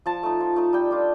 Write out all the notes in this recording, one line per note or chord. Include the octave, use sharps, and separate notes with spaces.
F3 A5
A3 D#4
F3
A3 D#4
G3 G5
D4 F4